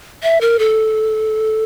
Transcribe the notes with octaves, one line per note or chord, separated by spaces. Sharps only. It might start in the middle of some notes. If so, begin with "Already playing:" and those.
E5
A#4
A4